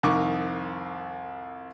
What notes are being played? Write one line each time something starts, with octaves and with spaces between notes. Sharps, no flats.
C2 F2 D#3 C#6 D6